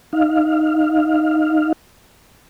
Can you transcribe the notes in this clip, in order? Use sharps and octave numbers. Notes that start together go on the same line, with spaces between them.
D#4 F5